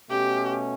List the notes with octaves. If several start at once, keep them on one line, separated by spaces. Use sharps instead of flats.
B2 A3 C#4 G4